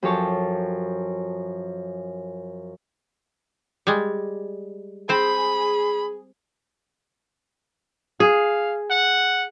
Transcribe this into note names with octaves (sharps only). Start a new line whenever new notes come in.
F#2 F3 G4 A4 C#5 A5
G3 G#3
C4 G#4 C5 B5
G#4 F5
F#5